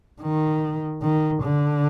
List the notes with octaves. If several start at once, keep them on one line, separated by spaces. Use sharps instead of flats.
D#3
D#3
D3